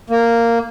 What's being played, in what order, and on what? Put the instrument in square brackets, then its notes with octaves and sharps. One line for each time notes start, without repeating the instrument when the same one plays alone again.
[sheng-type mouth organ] A#3